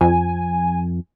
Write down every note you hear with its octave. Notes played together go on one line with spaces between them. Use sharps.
F2 G#5